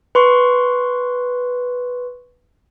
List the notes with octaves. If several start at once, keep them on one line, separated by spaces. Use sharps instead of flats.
B4 C6 C#6